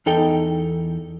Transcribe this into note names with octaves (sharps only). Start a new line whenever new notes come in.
E2 D#4 A4 G5